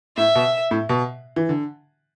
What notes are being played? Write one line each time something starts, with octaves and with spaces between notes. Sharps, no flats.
A2 E5
B2
A2
B2
E3
D3